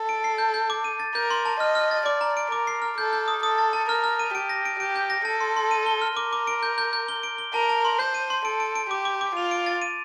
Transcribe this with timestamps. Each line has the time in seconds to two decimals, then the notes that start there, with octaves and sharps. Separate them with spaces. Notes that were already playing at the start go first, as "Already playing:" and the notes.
Already playing: A4
0.09 D7
0.24 C7
0.38 G6
0.54 G6
0.70 D6
0.84 D#7
1.00 A6
1.15 A#4 G6
1.30 C6
1.45 A5
1.60 D#5 F6
1.75 F6
1.91 A6
2.06 D5 D6
2.21 A#5
2.37 D7
2.51 A#4 D6
2.67 C7
2.82 F6
2.98 A4 G6
3.13 G6
3.28 D#6
3.43 A4 D#6
3.58 A6
3.73 A5
3.89 A#4 F6
4.04 F6
4.19 D#7
4.34 G4 D7
4.49 A#6
4.65 D7
4.80 G4 D7
4.96 G6
5.10 A#6
5.25 A4 A5
5.40 C6
5.56 C6
5.71 D#7
5.86 G7
6.02 F6
6.17 A#4 D6
6.33 D6
6.47 D7
6.63 G6
6.78 G6
6.93 G6
7.08 G7
7.23 D7
7.38 G7
7.54 A#4 A5
7.69 A5
7.85 C6
7.99 C5 G6
8.14 D#7
8.30 C6
8.45 A4 D7
8.60 D7
8.75 D7
8.90 G4 D6
9.05 D6
9.21 D6
9.36 F4 F7
9.51 D7
9.66 A6
9.82 D#7